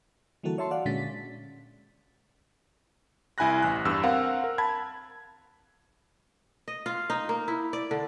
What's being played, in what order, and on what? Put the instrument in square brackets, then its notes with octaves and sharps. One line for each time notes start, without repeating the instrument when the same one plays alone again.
[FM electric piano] D3 E3 G3 A#3 F#4 A4
C#5 E5 A5 C6 C#6
F#4 D5 F5 F#5
A#2 D3 G#3 C#4 A6 B6
[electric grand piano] C2 E4 G#5 B5 F#6 A#6
A1 F#6
E2 G2 E6
C4 A#4 F5 F#5
A#4
A5 B5 G#6
[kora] D#5
F4
D#4
A#3
E4
D5
D3